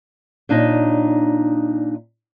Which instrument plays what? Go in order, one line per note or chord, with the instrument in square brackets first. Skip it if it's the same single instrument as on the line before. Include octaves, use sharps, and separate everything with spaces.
[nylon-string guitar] A#2 D4 D#4 C#5 D#5